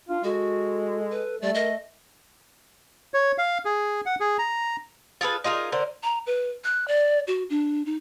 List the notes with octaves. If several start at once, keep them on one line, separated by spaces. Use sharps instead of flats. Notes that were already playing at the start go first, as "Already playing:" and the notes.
D4 F4
G#3 F#4 A4
B4
G3 A3 D5
A#4 D#5
C#5
F5
G#4
F#5
G#4
A#5
F4 G#4 A4 B4
D#4 F4 G#4 A#4
D3 A#4 C5
A#5
B4
F#6
D5
F#4
D4
D#4